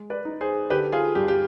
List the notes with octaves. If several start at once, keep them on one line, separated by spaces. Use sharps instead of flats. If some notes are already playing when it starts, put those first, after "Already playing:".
Already playing: G#3
B4 D5
D#4
G#4 C5
D3 G4 B4
F4 G#4
G2 G4
G4